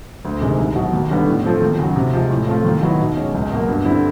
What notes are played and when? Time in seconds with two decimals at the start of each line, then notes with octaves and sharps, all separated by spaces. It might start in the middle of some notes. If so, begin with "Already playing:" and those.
0.25 D2
0.41 C3 D#3 G#3
0.59 C2
0.76 B2 F#3
0.93 D#2
1.10 D3 G3 B3
1.27 A2
1.44 F3 A3 C4
1.61 D#2
1.79 C#3 F#3
1.96 C3
2.13 F3 G#3
2.30 A2
2.47 F3 A3 C4 F4
2.65 D#2
2.82 D#3 F#3 B3 E4
3.00 B2
3.16 G#3 C#4
3.34 C#2
3.51 B2 F#3 A#3
3.68 G2
3.85 D3 G3 C4 E4